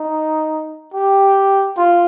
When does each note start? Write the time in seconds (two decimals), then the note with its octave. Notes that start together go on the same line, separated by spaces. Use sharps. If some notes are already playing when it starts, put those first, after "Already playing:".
Already playing: D#4
0.94 G4
1.77 F4